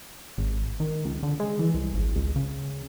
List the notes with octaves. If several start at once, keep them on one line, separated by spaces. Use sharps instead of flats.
G#1
D#3
C#2
D3
G#3
E3
C2
G#1
C#2
C#3